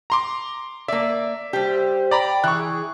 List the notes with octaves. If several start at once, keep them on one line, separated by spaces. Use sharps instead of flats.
A#5 C6 D6
A#3 D5 E5
G3 G4 C5
D5 G5 A#5 B5
E3 G#4 C#6 F#6